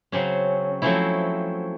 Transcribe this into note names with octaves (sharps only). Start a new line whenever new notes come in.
C#3 F#3 C4 C#4
F3 F#3 A3 C4 C#4 E4